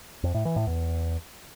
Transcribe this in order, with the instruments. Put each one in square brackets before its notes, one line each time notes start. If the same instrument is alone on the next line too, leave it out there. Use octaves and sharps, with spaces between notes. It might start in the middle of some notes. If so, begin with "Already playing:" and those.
[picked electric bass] F2
A2
E3
A2
E2